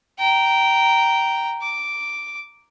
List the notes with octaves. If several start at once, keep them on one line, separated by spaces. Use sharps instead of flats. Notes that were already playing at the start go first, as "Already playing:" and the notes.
G5 A#5
D6